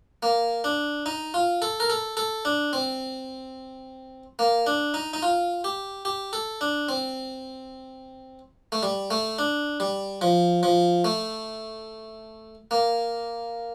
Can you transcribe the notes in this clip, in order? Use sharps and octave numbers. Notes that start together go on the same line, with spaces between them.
A#3
D4
D#4
F4
A4
A#4
A4
A4
D4
C4
A#3
D4
D#4
D#4
F4
G4
G4
A4
D4
C4
A3
G3
A3
D4
G3
F3
F3
A3
A#3